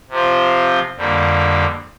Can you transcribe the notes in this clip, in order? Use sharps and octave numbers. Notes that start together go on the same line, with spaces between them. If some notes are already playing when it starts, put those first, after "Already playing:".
C3 F3 C4 F4
F2 D3 G3 A#3